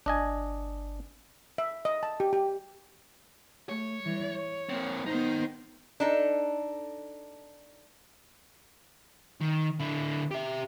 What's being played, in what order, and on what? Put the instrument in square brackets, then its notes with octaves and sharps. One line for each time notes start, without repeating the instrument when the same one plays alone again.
[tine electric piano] G1 [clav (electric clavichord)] D4 D#5 G#5
[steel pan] E5
D#5
A5
G4
G4
[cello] A3 [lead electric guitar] C#5
[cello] E3 G3
C#5
[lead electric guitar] A#3 C4
[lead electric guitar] D#3 D#4 [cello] B3 C5
[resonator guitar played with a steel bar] D4 D#4 A4
[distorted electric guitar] D#3
D3 E4
G4 E5